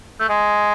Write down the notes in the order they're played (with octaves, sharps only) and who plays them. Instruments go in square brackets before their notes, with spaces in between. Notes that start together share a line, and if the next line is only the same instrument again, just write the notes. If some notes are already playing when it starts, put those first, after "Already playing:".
[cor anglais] A3
G#3